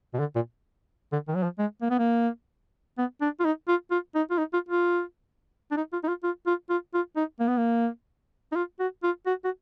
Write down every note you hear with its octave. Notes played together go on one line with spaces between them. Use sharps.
B2
D3
A#2
D3
D#3
F#3
F3
G#3
A#3
B3
A#3
B3
D4
F4
D#4
F4
F4
D#4
F4
D#4
F4
F4
D4
D#4
F4
D#4
F4
F4
F4
F4
F4
D#4
A#3
B3
A#3
D#4
F4
F#4
F4
F#4
F#4